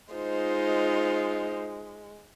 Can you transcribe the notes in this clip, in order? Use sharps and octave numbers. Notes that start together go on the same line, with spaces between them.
G#3 D#4 F4 C5